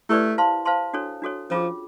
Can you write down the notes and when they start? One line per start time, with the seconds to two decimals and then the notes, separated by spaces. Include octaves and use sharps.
0.09 A3 E4 G4 B4 D5
0.38 C5 F5 A5 C6
0.65 C5 F5 A5 C6
0.93 D4 F#4 A4 C#5
1.22 D4 F#4 A4 C#5
1.50 F3 C#4 F4 G#4